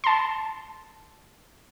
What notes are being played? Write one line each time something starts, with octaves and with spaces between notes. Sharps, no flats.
A5 C6